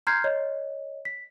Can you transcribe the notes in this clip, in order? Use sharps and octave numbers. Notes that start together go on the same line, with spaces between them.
A#5 C6 F6 G6 G#6 C7
C#5 D#5
B6